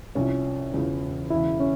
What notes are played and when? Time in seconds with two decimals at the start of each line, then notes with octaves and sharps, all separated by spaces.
0.15 C2 C3 F3 C#4
0.73 E1 E2 C#3 F3
1.30 E1 E2 C#3 E4
1.60 C#4